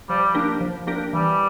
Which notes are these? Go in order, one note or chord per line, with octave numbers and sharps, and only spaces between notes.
F3 G3
A#3 D4 G4 A#4
F3
A#3 D4 G4 A#4
E3 G3